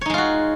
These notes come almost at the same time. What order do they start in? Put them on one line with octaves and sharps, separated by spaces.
C#5 D#4 G#3 F4 F#4